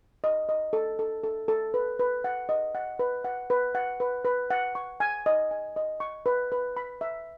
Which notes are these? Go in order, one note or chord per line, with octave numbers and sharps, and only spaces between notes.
D#5
D#5
A4
A4
A4
A4
B4
B4
F#5
D#5
F#5
B4
F#5
B4
F#5
B4
B4
F#5
C#6
G#5
D#5
G#5
D#5
C#6
B4
B4
B5
E5